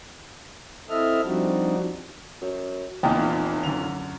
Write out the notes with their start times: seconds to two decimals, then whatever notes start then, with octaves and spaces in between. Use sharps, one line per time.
0.89 C4 E4 A4 D#5 E5 F6
1.24 F3 G3 C4 D4 D#4 F#4
2.41 F#2
3.03 F1 E2 A#2 D#4 F4 G5
3.63 F#2 D3 F7